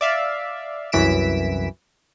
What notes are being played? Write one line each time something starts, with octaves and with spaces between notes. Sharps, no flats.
D5 E5 F5
C2 F#2 E3 B6 D7 E7